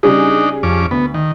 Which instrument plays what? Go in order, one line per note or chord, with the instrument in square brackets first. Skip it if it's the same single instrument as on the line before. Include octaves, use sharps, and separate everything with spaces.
[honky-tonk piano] C#3 G3 G#4 [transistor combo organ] D4 D#4
[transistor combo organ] F2 C#4 D6
[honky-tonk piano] D2 [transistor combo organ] B3
[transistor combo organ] D#3